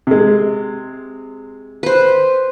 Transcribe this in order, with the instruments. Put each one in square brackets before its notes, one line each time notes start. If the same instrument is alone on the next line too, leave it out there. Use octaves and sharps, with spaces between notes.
[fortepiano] C3 G#3
[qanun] B4 C5